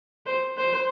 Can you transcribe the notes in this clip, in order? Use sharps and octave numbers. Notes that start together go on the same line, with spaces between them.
C5
C5